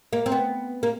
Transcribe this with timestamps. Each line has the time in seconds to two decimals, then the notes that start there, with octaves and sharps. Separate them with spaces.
0.13 A#3
0.26 C4
0.32 B3
0.83 A#3